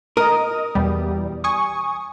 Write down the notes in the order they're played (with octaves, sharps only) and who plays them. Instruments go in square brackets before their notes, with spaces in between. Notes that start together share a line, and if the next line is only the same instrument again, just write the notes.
[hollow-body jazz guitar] A#4 [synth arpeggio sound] D#5 D#6
[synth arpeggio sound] E2 B2 G3
G#5 C#6 D#6